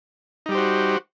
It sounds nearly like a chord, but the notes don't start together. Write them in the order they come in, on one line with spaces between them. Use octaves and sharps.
D#4 G3 G4 C5 F#4